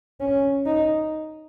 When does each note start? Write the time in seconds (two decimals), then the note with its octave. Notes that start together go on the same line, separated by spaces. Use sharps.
0.20 C#4
0.66 D#4